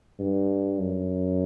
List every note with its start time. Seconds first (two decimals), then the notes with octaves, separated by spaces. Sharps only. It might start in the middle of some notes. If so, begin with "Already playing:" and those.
0.19 G2
0.79 F#2